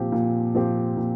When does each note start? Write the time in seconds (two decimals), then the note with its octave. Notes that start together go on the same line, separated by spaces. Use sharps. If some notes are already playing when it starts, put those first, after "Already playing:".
Already playing: A#2 F3 C4 G4
0.12 A#2
0.55 F3 C4 G4
0.97 A#2